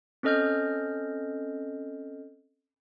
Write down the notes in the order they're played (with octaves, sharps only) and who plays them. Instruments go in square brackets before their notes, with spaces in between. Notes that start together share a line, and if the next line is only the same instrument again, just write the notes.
[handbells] C4 C#4 A4 D#5 F6 G6